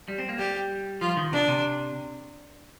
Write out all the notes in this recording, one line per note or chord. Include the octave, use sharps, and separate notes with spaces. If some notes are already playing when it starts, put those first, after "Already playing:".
G3
C4
A#3
G3 G4
F3 F4
D#3
C3 D4
C3